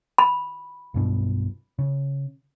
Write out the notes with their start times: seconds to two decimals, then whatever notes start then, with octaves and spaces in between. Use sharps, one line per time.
0.18 B5
0.94 B1 G2 B2
1.79 C#3